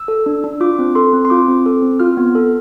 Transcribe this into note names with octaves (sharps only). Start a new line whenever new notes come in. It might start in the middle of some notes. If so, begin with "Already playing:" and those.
Already playing: E6
A4
D4
D4
F4 D6
C4
A4 C6
C4
C6
F4 D6
C4
A4
C4
F4 F6
B3
A4